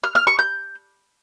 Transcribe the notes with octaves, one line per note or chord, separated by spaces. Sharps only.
F6
F6
C#6
G6